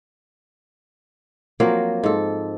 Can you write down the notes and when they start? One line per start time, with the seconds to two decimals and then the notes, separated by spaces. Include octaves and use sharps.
1.60 F3 F#3 A#3 C4
2.04 G#2 A4